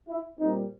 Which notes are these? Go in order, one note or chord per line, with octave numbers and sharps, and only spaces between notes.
E4
A#2 G3 C4 D#4